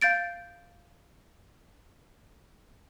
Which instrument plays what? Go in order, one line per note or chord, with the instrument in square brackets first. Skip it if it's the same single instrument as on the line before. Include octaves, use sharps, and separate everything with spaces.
[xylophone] F5 G6 A6 D7